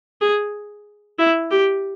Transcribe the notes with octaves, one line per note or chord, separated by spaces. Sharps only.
G#4
E4
G4